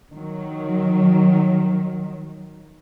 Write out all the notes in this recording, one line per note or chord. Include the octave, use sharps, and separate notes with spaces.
D#3 F#3